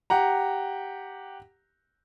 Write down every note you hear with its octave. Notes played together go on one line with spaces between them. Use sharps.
G4 F#5 A#5